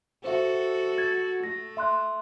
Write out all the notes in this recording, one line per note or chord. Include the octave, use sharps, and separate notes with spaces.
F#4 A4 C5 E5
G#6 A6
A3 A#6
E5 C6 F#6